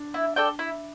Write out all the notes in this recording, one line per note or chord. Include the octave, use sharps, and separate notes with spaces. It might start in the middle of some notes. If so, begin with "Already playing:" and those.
Already playing: D4
E4
A4 D5 G5
E4